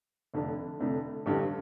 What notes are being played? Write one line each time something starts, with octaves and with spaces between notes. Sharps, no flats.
F1 F2 D3 A3 D4
F1 F2 D3 A3 D4
A1 G2 D3